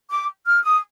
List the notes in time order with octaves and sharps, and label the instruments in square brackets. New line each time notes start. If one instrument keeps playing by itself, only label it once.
[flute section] D6
F6
D#6